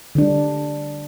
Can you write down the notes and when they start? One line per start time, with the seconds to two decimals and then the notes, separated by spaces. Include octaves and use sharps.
0.15 D3
0.18 D4
0.21 G3